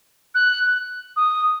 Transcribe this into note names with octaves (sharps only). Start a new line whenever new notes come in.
F#6
D#6